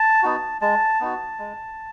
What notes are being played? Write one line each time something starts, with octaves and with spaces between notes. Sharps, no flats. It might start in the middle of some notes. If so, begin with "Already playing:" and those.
Already playing: A5
B3 D#4 F#4
G#3 A5
B3 D#4 F#4
G#3